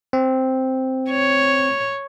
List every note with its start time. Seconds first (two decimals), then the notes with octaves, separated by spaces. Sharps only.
0.13 C4
1.10 C#5